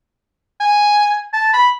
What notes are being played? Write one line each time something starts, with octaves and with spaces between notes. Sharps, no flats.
G#5
A5
B5